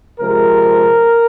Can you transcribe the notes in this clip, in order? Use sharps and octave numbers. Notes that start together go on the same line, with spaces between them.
C3 F3 G#3 A#4